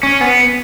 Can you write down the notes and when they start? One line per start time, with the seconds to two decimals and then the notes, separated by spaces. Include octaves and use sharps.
0.03 C#4
0.21 B3